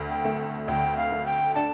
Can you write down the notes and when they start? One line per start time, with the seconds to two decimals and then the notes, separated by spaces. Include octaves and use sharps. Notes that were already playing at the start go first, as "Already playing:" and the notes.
Already playing: D2
0.09 G5
0.25 A3
0.68 D2 G5
0.97 F5
1.12 A3
1.26 G5
1.55 D4 A5